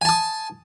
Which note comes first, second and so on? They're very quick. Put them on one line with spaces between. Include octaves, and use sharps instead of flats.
G#5 A5 D#6